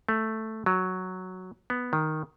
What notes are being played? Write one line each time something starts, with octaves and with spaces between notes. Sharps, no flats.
A3
F#3
B3
D#3